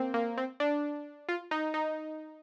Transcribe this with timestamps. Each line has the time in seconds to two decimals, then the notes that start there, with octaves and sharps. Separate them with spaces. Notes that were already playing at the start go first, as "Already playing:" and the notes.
Already playing: A#3 C4
0.14 A#3
0.38 C4
0.60 D4
1.29 F4
1.51 D#4
1.74 D#4